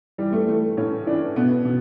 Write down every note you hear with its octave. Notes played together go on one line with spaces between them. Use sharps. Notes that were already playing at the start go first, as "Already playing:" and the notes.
E3 G3
A3
E3 A3
A2 C#4
E3 D4
B2 B3
B2